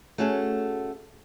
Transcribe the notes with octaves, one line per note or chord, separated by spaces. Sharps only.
A3 C#4 F#4 G#4 A4